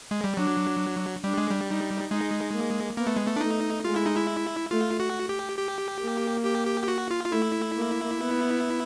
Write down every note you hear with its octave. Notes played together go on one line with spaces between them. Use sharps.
G#3
G3
F#3 D4
G3 D4
G#3
G3
D#4
G#3 D#4
A#3
A#3 B3
A3
G#3
A3
D4
A3 D#4
G#3 F4
E4
D#4
E4
A3 F4
F#4
G4
G4
A#3
G4
G4
G4
F#4
F4
F4
A3 E4
A#3
B3